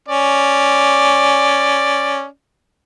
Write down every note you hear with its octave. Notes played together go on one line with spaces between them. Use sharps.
C#4 D5